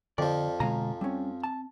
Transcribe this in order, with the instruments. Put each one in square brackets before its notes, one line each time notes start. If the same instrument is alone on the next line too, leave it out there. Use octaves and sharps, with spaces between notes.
[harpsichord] F2 F3 [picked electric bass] D3 [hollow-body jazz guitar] D5
[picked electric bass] B2 D3 G#3 [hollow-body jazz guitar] F5 G#5 A#5
[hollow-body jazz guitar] G3 C#4 [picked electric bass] C4
[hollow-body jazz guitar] A5